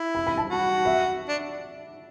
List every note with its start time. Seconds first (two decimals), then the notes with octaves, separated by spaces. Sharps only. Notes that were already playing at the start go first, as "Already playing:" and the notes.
Already playing: E4
0.15 B5
0.27 B5
0.38 A5
0.50 F#4
0.85 E5
1.28 D4